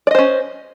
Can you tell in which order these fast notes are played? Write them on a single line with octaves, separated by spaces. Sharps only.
D5 D#5 C5 C#4